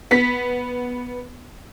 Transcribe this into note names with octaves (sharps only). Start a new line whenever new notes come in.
B3 B6